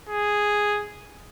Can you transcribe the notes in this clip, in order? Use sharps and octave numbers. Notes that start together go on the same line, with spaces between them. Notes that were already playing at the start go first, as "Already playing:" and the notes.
G#4